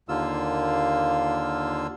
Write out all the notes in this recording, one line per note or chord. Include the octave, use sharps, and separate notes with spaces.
D#2 D3 A#3 F4 E6